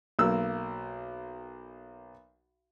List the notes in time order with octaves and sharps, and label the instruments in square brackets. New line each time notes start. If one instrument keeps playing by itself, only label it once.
[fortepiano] B1 A#3 E6